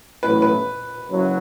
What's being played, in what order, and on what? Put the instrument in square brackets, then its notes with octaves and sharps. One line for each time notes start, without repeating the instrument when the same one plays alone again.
[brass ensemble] A1 A2 F#3 B3 E4 [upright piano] B4
[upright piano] B4
[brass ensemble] F#1 F#2 F#3